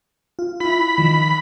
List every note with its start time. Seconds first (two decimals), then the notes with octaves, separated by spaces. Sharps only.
0.39 F4
0.60 E4 F4 B5
0.98 D#3 F3